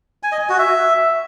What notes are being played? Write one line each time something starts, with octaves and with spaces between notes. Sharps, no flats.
G#5
D#5
G#5
F#4
E5